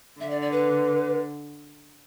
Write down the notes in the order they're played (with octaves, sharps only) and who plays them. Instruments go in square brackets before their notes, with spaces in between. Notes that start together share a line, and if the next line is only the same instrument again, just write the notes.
[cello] D3 [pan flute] E5
[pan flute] D5
D5
B4